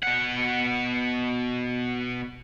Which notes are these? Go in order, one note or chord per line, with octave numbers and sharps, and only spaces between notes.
B2 F#5